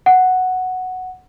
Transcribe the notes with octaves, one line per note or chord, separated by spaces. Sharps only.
F#5